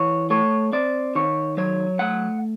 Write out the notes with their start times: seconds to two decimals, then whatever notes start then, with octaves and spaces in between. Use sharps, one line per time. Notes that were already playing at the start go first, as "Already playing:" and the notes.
Already playing: E3 C#5
0.30 A3 C#5
0.72 C4 D5
1.15 D#3 C#5
1.57 F#3 C#5
1.99 A3 F#5